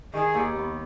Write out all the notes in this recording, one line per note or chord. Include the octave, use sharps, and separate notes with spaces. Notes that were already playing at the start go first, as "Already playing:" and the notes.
D#3 G#4
D#2
B3